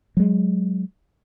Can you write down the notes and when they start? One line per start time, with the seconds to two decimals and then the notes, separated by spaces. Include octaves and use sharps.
0.17 F#3 G#3